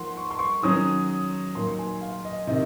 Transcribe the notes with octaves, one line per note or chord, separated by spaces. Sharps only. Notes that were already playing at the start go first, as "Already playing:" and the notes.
Already playing: F3 A#3 D#4 F#5 C6
C#6
C6
C#6
D#3 F#3 C#4 D#6
A#2 F#3 A#3 D#4 C6
G#5
F5
D#5
C3 D#3 D#5